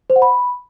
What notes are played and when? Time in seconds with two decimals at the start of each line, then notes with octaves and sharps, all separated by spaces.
0.10 C5
0.16 F#5
0.22 B5